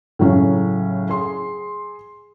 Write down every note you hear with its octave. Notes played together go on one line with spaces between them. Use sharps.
A2 C#3 F#3 C#4
G#4 C6